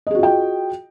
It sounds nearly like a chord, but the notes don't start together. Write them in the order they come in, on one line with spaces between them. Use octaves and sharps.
D#5 G#4 F#4 F4 G5